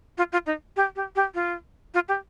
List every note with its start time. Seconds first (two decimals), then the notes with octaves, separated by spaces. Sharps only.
0.18 F4
0.32 F4
0.46 D#4
0.76 G4
0.96 G4
1.16 G4
1.35 F4
1.94 F4
2.09 G4